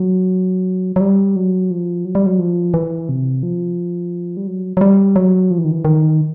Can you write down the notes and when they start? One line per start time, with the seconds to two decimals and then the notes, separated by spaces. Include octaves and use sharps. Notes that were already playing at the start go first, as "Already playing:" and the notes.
Already playing: F#3
0.96 F#3
1.01 G3
1.36 F#3
1.71 F3
2.05 F#3
2.15 G3
2.26 F#3
2.39 F3
2.74 E3
3.09 C3
3.43 F3
4.37 G3
4.47 F#3
4.77 F#3
4.81 G3
5.16 F#3
5.51 F3
5.58 E3
5.65 D#3
5.71 E3
5.85 D#3